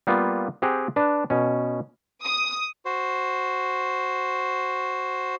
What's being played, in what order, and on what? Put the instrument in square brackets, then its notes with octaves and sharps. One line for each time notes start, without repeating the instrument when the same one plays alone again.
[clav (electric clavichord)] G3 A#3 B3 F4
C4 G4 G#4 F#5 A#5
D4 B4
B2 C#4
[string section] D#6
[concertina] F#4 C5